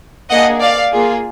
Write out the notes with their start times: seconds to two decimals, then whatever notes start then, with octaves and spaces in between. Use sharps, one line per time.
0.30 A#3 D4 G#4 D#5 F#5
0.61 D5 F5
0.92 A#3 F4 G#4